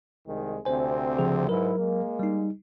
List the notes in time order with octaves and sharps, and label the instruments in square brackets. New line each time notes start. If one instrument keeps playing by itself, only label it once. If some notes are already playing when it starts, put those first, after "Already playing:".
[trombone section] C2 D#3 G#3
[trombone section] D2 C3 C4 [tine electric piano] C5 G#5
[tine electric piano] C#3 F3 G#4
[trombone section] G#2 E4 B4 [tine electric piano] F#3 A#4
[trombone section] G#3 A#3
[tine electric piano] G3 D#4